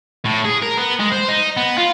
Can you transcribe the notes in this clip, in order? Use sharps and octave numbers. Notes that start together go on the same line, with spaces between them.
A2
G#4
A#4
B3
G#3
C5
D#4
B3
F4